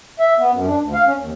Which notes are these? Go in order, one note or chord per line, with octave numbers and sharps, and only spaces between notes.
E5
B3
F#2
D4
D2
F5
C#4
D#2